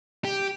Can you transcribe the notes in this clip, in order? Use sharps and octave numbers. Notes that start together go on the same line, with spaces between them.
G4